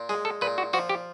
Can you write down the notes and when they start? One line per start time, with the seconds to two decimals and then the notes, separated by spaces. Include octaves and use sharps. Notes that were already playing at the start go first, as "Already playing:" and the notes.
Already playing: A#2
0.09 G#3 G#4
0.25 A4
0.41 A#2 B4
0.58 F#4
0.73 F3 F#4
0.89 G4